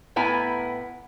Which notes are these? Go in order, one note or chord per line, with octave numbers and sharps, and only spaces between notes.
A2 B3 E4 G#5 A#5